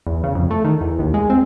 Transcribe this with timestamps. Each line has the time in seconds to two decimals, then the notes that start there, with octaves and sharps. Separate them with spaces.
0.07 E2
0.24 C#3
0.35 F2
0.51 A3
0.65 D#3
0.81 E2
0.99 D#2
1.14 G#3
1.30 C4